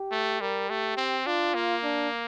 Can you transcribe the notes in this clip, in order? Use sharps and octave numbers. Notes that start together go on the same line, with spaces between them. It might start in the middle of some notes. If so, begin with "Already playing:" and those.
Already playing: G4
A3
G3 A#4
A3 G4
C4
D4 F4
A#3
D4